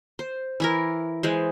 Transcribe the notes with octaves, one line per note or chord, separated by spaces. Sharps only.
C5
E3 E4 A#4
E3 G#3 C5